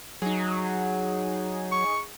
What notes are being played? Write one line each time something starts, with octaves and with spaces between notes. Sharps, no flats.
F#3 D#4 G#4
C#6